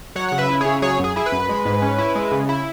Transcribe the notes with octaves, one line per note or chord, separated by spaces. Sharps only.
F#3 C#5 F#5
C#3 F#5
B4 E5
E4
C#3 G#4 C#5
F#3 G#4 C#5
F#2 G#4
E4 G#4
B4
F#2
G#3
G#2
C#4
E4
G#3
C#3
E4